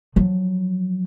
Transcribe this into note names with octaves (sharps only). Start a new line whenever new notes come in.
F3 F#3